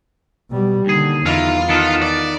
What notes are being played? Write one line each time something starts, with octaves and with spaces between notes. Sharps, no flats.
B2 G3
D#2 D3 G#4
E2 D#3 E3 F4
D#3 B3 A4
D5